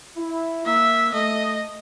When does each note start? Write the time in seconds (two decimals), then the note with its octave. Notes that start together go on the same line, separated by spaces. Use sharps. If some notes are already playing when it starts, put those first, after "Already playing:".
0.17 E4
0.66 A#3 E5
1.13 A3 D#5